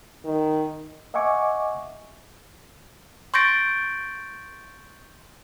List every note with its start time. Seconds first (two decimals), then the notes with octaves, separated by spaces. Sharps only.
0.25 D#3
1.14 D#5 E5 F#5 G#5 C#6 D6
3.34 C6 C#6 G6 A6 A#6 D7